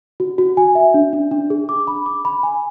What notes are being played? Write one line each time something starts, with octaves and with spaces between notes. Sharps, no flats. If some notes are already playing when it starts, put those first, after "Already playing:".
F#4
F#4
G#5
E5
D4
D4
D4
G#4
D6
B5
D6
B5
G#5